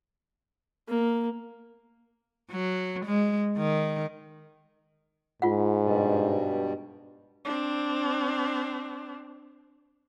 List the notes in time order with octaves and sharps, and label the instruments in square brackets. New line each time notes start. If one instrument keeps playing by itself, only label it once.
[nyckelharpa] A#3
[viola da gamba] F#3
G#3
D#3
[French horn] G#2 [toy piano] F4 F#5
[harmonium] G2 B2 G3
[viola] C4 D4